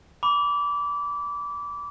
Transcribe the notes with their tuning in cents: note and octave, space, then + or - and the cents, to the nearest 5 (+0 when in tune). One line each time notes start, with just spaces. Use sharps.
B5 +5 D6 -25